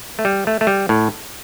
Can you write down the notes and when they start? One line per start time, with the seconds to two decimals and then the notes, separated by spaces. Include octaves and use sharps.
0.19 A3
0.25 G3
0.47 A3
0.61 A3
0.67 G3
0.89 A2